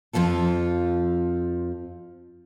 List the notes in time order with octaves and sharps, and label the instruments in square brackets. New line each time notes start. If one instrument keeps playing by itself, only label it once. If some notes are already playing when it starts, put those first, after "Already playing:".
[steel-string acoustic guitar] F2 A#2 F3 F4 A4